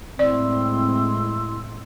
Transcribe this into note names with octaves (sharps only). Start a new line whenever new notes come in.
A2 G#3 C4 E4 D5 C6 E6